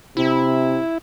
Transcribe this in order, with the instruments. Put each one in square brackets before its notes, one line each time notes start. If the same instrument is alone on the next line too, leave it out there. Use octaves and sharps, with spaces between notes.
[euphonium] C3 [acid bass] E4